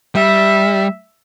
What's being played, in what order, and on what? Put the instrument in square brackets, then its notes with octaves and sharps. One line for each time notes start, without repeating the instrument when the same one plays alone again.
[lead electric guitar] G3 [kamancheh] E5